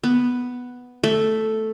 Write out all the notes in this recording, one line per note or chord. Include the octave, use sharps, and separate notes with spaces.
B3
A3